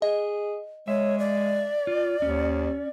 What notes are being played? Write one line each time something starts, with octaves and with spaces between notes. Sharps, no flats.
G#4 D#5
G#3 C#5 E5
D5
F4
D#2 C#4